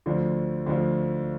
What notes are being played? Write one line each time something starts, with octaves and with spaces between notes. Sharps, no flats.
D2 D3 F3
D2 D3 F3